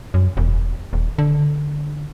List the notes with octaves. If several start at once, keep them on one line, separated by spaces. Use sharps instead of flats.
F#2
E1
D#1
D3